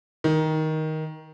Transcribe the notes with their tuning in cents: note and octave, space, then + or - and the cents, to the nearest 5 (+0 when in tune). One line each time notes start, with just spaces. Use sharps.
D#3 +10